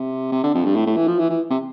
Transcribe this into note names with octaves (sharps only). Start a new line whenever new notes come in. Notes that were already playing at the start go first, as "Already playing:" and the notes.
Already playing: C3
C3
D3
F2
G2
A2
A2
E3
F3
E3
E3
C3